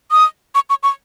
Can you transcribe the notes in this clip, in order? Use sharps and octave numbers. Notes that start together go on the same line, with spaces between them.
D#6
C#6
C#6
C#6